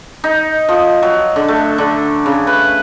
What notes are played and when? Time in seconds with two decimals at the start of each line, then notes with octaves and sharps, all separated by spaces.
0.24 D#4
0.69 F3
1.02 F#3
1.36 D3
1.48 A3
1.78 D3
2.26 C#3
2.47 B4